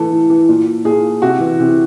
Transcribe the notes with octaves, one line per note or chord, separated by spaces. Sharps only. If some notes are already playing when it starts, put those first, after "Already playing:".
Already playing: A2 E3 A4
A2
E3
A#2
A#2 G#4
C3 F#4
E3
C3